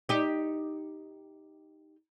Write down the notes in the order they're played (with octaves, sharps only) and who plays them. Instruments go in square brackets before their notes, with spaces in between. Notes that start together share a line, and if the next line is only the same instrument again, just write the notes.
[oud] D#4 G4